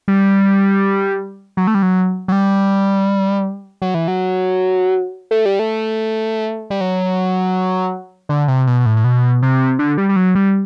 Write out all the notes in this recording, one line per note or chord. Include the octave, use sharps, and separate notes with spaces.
G3
F#3
A3
G3
F#3
F#3
G3
F#3
E3
F#3
A3
G3
A3
G3
F#3
D3
C3
B2
B2
A2
A2
B2
C3
D3
G3
G3
F#3
G3